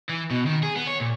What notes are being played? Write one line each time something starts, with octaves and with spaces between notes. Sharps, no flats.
E3
B2
D#3
G#4
B3
C#5
A#2